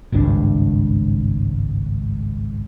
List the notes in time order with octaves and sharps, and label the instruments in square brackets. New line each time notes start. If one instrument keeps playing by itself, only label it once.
[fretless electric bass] G#1 C#2 G2 D4